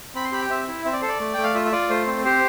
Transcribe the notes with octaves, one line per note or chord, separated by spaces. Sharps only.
C4 B5
C6
G4 B5
G5
C4 E5
E4
C4 E5
D5
A4 C5
D5
A3
A3 G5
F5
F4 E5
E5
F4 D5
A3 C5
C4
G4 C5